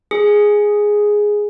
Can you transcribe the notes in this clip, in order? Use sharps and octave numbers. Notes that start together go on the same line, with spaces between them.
G#4